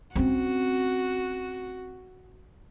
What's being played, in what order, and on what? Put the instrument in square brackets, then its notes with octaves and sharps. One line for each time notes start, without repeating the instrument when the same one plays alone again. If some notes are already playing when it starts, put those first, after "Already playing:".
[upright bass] C4 C#4 [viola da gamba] F#4